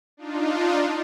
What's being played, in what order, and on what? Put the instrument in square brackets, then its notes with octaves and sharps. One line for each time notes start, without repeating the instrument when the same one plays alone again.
[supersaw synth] D4 D#4 F4